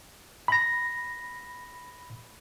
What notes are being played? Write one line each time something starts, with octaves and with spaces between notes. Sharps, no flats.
B5 A#6